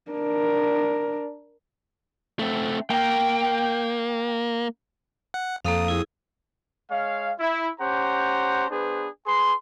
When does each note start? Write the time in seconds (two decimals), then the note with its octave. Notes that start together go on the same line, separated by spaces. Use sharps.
0.11 D4 A#4
2.39 A3 C4
2.90 A#3 G5
5.34 F#5
5.65 F2 A#3 A4 F5 D#6
5.88 E4 G#4
6.91 G#3 C#5 F5
7.39 E4
7.81 C#4 G4 C5 F#5 A#5
8.70 B3 D4 G#4 B4 C5
9.26 G#4 B4 C6